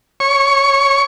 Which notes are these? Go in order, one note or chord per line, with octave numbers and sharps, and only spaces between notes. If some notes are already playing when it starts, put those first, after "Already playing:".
C#5 C#6